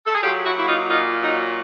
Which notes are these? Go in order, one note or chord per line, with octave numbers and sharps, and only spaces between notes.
A4
G#4
F#3 F4 G4
E4 F#4
A#3 E4
D#4 F4
A#2 D#4 F4
F#3 D#4